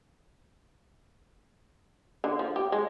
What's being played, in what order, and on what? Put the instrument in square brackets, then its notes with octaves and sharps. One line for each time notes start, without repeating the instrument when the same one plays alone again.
[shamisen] D3
F3
G4
G#3